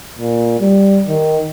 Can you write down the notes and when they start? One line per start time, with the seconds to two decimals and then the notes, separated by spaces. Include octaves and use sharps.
0.18 A#2
0.60 G3
1.07 D#3